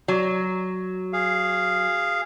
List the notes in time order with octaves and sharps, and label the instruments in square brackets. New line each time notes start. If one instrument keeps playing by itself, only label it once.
[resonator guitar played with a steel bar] F#3
[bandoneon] G#4 F5